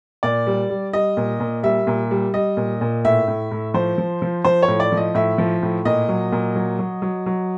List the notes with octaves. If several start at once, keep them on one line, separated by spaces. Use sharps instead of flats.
A#2 D5
G3
G3
G3 D#5
A#2
A#2
G3 E5
A#2
G3
G3 D#5
A#2
A#2
A2 E5
A2
A2
F3 C5
F3
F3
F3 C5
C#5
A2
D5
F3
D#5
A2 E5
F3
A2
A#2 D#5
F#3
A#2
F#3
F#3
F#3
F#3